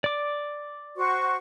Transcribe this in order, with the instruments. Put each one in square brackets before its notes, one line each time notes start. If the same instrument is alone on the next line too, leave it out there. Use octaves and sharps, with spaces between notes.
[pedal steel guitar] D5 D6
[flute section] F#4 C5 C#6